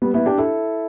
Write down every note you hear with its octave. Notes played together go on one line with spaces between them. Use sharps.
G3 B3
B3 E4
D4 G4
E4 A4